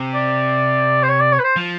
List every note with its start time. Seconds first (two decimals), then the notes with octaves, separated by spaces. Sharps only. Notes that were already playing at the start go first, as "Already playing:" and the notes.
Already playing: C3
0.14 D5
1.03 C5
1.09 C#5
1.20 D5
1.32 C#5
1.39 B4
1.44 C5
1.56 F3